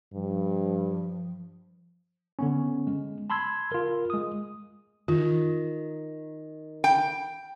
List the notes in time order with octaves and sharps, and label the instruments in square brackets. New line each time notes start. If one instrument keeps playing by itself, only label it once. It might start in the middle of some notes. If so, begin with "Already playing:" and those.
[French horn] G2 [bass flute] F3
[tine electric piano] D3 B3 C#4
G#3
A5 B5 C6 E6 G#6
F4 A#4
G#3 D#6
[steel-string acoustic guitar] D#3 [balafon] F4
[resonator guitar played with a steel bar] G5